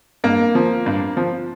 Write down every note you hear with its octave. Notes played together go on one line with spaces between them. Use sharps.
G2 A#3
F3
G2
F3